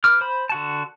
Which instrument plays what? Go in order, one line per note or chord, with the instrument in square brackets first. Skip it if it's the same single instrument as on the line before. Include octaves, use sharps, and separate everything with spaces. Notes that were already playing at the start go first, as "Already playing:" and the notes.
[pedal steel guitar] B4 D6 F6
C5 B5
D3 F#4 A5